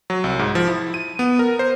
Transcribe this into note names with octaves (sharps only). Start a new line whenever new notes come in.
F#3
C2
G#2
F3
E4
D#7
B3
A#4
C5